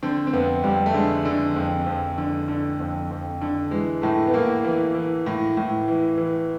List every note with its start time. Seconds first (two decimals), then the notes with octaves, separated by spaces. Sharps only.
0.03 D3 C4
0.27 C4
0.33 F2 B3
0.63 F2 G3
0.86 A3
0.94 D3 G#3
1.25 D3
1.56 F2
1.86 F2
2.18 D3
2.48 D3
2.80 F2
3.11 F2
3.41 D3
3.71 E3 G#3
4.02 A2 A3
4.27 B3
4.34 A2 A#3
4.64 E3
4.95 E3
5.26 A2
5.57 A2
5.88 E3
6.18 E3